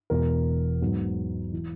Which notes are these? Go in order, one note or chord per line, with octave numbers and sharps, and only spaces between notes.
E1 E2 B2 A#4
G#2 F#3 B3
E3